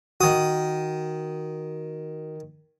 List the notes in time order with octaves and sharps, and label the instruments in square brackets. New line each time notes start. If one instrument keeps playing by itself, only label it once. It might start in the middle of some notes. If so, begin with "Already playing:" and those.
[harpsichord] D#3 D#6 [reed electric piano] F#4